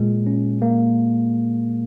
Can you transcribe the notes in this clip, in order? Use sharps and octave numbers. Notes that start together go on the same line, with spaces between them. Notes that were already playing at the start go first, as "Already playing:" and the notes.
Already playing: A#2 G#3
C#4
A#3